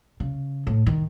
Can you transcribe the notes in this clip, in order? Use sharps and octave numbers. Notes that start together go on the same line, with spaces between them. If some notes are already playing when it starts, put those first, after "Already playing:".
C#3
A2
D#3